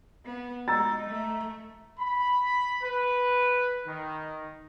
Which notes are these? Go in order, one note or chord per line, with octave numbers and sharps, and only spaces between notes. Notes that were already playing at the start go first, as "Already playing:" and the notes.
B3
G#3 D#4 A#5 E6 A6
A3
B5
B4
D#3